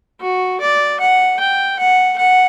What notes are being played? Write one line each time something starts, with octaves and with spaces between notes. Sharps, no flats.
F#4
D5
F#5
G5
F#5
F#5